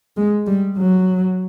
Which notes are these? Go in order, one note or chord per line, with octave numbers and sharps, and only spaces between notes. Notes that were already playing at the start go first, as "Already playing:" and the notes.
G#3
G3
F#3